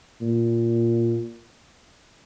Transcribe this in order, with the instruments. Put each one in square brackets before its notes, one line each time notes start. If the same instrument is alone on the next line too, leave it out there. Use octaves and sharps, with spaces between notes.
[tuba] A#2